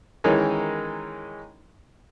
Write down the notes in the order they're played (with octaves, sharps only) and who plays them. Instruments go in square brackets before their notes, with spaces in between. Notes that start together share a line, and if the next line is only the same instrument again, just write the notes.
[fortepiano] D#3 E3 G#3 C#4 D#4 A#4